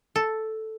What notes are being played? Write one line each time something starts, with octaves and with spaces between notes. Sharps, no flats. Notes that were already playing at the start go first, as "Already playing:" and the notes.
A4